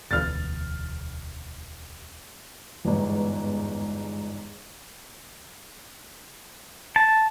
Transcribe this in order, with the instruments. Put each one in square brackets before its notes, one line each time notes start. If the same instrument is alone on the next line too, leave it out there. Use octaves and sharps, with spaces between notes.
[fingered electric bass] E1 D2 E3 [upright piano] F6 A6
[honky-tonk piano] G1 E2 G#2
[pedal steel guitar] A5